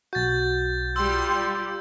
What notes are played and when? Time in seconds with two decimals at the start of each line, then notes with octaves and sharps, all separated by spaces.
0.13 B1 F#4 G6 A6
0.96 G3 F4 G4 C6 E6